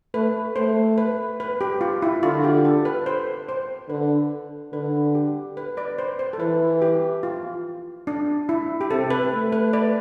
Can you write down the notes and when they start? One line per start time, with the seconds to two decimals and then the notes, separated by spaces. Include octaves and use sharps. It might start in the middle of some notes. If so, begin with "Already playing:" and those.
0.14 A3 B4
0.56 A3 C5
0.98 B4
1.40 B4
1.61 G4
1.81 F4
2.02 E4
2.23 D3 F4
2.44 G4
2.65 A4
2.85 B4
3.06 C5
3.48 C5
3.89 D3 B4
4.73 D3 B4
5.15 G4
5.57 B4
5.77 B4 D5
5.98 C5
6.19 C5
6.33 A4
6.39 E3 B4
6.82 G4
7.23 F4
8.07 D4
8.49 E4
8.81 G4
8.90 C3 A4
9.11 B4
9.32 A3
9.52 B4
9.73 B4 D5